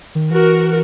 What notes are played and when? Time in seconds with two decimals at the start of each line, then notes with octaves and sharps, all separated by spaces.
0.15 D#3
0.31 E3 F#4 A#4